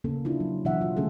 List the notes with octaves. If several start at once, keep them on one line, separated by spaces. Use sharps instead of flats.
C#3 A#3 C#4 A4
D4 E4 F4
F#3
B2 E3 F#3 D4 E5 F#5
F4
D3 G#3 A3 C#4 G#4 A4